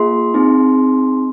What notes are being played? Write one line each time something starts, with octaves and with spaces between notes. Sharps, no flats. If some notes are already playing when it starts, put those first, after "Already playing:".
Already playing: A#3 F4 G#4 C6
C4 D#4 G#4